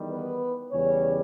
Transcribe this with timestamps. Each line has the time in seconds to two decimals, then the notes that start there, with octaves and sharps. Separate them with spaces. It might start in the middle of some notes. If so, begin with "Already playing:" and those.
Already playing: E2 D#3 G3
0.11 B3 B4
0.71 E2 C#3 G3 C#4 C#5